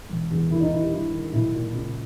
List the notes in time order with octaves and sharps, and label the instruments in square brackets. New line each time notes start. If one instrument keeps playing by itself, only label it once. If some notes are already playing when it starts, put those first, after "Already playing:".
[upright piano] E1
E2
D#2 E4
D#4
D#3 E4
G4
G2 E4
D#3
B1 E4
A#2
C#2